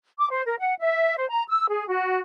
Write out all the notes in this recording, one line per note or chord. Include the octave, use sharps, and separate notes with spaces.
D6
C5
A#4
F#5
E5
C5
A#5
E6
G#4
F#4